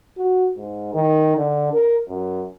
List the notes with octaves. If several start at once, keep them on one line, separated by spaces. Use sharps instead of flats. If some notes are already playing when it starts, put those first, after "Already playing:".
F#4
G#2
D#3
D3
A#4
F#2